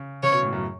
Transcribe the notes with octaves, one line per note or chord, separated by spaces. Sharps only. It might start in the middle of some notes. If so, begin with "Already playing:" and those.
Already playing: C#3
C#3 C#5
B2
A2
F#2